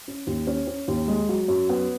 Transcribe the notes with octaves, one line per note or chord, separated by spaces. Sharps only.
C#4
D#2
C#4
C#4
D#2
G#3
F#3
F#2
B3